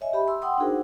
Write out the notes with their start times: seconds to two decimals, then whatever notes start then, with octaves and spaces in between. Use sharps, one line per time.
0.01 C#5 D#5 E5 G#5
0.13 G4 E5 B5
0.28 C6 E6
0.42 F#5 G5 C6 D#6 E6
0.58 D4 D#4 F#4 G#4 A#4 C5